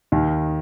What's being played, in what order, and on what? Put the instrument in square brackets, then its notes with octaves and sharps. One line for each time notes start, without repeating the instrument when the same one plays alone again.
[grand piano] D#2 D#3